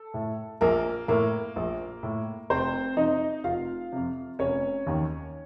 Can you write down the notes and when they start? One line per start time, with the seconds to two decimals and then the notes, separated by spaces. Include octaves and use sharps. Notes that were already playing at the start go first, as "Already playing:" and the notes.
Already playing: A4
0.14 A2
0.61 A#1 A#3 A#4
1.08 A2 A#3 A#4
1.56 A#1
2.03 A2
2.50 F1 C4 C5
2.97 F2 C3 D#4 D#5
3.44 F1 F4 F5
3.92 F2 C3
4.39 F1 C#4 C#5
4.86 D#2 D#3